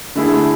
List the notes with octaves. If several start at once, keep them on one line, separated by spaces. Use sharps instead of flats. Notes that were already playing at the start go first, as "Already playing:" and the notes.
D3 A3 E4 G#4